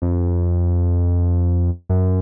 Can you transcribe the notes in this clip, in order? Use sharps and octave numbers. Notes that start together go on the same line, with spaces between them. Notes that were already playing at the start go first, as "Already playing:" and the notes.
F2
F#2